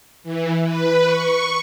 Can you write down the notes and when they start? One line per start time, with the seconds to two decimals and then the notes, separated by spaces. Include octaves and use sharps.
0.24 E3
0.64 B4
1.04 C#6